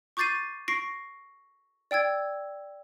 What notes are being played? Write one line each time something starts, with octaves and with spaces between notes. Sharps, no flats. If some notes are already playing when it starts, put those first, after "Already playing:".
C#6 D6 G6 A6 C7 D#7
C#6 A#6 C7 D7
D5 G5 E6 G#6